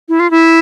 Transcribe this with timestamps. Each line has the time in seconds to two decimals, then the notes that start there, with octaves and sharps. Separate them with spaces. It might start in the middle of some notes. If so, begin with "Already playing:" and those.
0.09 E4
0.20 F4
0.31 E4